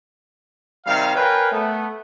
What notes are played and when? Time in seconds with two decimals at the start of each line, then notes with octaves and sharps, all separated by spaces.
0.86 C3 D#3 G3 F5
1.16 A#4 B4 C#5 F5 G5 G#5
1.52 A3 B3